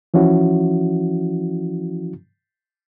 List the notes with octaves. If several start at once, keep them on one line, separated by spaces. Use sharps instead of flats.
E3 F3 C#4 E4 F#4